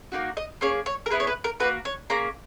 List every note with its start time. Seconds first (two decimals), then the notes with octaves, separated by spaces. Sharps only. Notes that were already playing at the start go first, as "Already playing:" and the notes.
0.12 A#3 D#4 F#4
0.37 D#5
0.61 A#3 C#4 G#4 C#5
0.86 C#5
1.06 A#4
1.10 B3 E4 G#4 B4
1.20 C#5
1.27 B4
1.44 A#4
1.60 A#3 D#4 F#4 B4
1.85 C#5
2.10 A#3 C#4 G#4 A#5